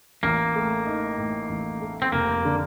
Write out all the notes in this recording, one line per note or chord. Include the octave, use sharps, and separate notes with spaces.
A1 A#3
A3
D#4
A2
A1
A3
C4
F1 A#3
D3